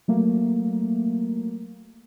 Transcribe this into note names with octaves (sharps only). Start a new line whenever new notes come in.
F#3 A3 A#3